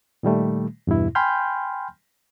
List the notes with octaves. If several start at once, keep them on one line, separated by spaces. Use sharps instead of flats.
A#2 D#3 G3 A3
E2 G2 B2 E4
G5 G#5 B5 C6 F6 G6